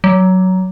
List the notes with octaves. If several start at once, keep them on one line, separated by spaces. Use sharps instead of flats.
F#3